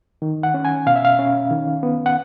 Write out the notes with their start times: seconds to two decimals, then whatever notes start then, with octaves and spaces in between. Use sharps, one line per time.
0.22 D#3
0.43 F#5
0.54 C#4
0.65 G#5
0.87 B2 F5
0.96 E5
1.05 F5
1.19 C#4
1.51 D#3
1.83 B3
2.06 F#5